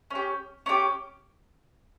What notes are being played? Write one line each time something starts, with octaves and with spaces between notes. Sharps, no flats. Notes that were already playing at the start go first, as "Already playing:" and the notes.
C#4 G4
C#4 E4 G4